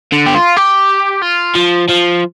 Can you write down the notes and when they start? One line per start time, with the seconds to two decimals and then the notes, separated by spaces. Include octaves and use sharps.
0.12 D3
0.27 G4
0.35 F4
0.57 G4
1.22 F4
1.55 F3
1.89 F3